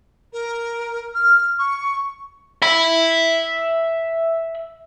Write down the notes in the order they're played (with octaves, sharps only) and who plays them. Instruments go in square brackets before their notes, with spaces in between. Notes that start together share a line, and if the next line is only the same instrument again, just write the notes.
[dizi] A#4
F6
C#6
[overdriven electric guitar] E5 B5